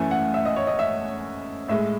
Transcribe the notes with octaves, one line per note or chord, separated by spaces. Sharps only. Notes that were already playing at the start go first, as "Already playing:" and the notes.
Already playing: F#2 E3 A3 G#5
F#5
E5
D#5
C#5
D#5
E5
A2 G#3 E5